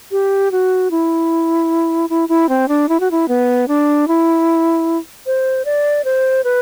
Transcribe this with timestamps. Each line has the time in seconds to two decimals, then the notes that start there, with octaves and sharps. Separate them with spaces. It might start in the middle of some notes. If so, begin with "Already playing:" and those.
0.11 G4
0.52 F#4
0.91 E4
2.10 E4
2.29 E4
2.49 C4
2.68 D4
2.89 E4
3.00 F#4
3.11 E4
3.28 B3
3.68 D4
4.08 E4
5.26 C5
5.65 D5
6.05 C5
6.44 B4